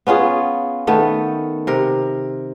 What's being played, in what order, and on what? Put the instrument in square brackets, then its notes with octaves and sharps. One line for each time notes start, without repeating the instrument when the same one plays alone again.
[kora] B3 C#4 F4 G#4
D#3 A3 B3
C3 A#4